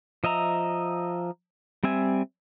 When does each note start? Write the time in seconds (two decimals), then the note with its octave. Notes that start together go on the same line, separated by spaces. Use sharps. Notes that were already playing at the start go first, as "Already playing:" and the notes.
0.24 F3 D#5 E5 A#5
1.84 G3 C4 E5 G#5